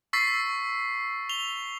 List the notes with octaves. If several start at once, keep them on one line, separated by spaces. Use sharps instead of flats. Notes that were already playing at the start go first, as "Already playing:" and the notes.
C#6 E6 A6 B6 C7
F7 G7